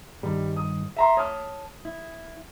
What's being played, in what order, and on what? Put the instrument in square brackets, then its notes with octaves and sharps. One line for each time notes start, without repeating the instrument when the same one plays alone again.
[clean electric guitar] G2 D#3 [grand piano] G3
[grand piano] D#6
E5 A#5 C6
[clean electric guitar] C#5 A5 [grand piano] D#6 F6
[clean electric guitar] E4